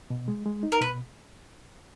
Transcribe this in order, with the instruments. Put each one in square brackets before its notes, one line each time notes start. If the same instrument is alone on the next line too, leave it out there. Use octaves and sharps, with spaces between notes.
[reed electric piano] B2
G#3
G#3
D#4
[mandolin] A#4
[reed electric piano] B2 [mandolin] B4